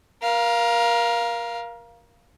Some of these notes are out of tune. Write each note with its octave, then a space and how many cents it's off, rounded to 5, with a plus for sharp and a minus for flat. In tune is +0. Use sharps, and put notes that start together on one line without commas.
A#4 +25 F5 -5